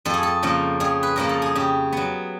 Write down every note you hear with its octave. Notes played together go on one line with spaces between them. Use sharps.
F2 A4
G#4
A4
C#3 F3 A#3
F2 G#4
B4
C#3 F3 A#3 A#4
A4
G#4
C#3 G4
F#3 B3